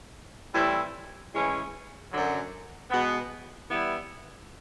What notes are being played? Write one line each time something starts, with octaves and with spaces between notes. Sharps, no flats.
A2 E3 G3 C4 E4
A2 E3 G#3 C#4 E4
F#2 D3 F#3
B2 G#3 B3
E3 G3 B3 E4